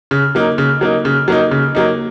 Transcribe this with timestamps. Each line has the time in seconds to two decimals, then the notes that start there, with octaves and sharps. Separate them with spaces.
0.11 C#3
0.35 F#3 A#3 D#4
0.58 C#3
0.81 F#3 A#3 D#4
1.05 C#3
1.28 F#3 A#3 D#4
1.51 C#3
1.75 F#3 A#3 D#4